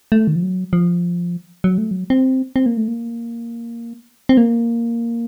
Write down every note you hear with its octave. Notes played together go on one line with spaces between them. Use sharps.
A3
D#3
F3
F#3
F3
F#3
A3
F#3
C4
C4
A#3
A3
A#3
C4
A#3